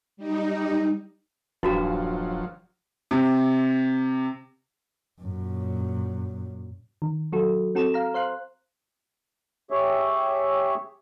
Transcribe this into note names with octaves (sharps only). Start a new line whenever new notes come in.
G3 D#4
D#1 G2 F3 F#3 E4 F#4 A#5
C3
F#2 A#2
D#3
F#3 F#4 A4
C4 F#4 A4 E7
F5 A#5
C5 F5 C6 F#6
G4 G#4 C#5 E5